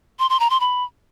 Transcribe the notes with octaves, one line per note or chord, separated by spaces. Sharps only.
C6
C6
A#5
C6
B5